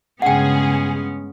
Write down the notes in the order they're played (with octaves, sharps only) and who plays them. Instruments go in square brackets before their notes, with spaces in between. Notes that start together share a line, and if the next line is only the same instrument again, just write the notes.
[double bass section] G2 C#3 [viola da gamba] G#3 B3 C#4 [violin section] G#4 [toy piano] F#5 G5